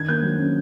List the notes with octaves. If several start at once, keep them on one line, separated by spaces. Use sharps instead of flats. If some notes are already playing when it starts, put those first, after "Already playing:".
Already playing: D#3 D4 G#6
A#3 G6
F#3
C#4